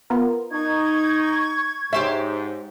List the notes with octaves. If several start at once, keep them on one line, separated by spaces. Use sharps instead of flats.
B3 F4 A#4
D#4 C#6 G#6
G#2 G4 C5 C#5 E5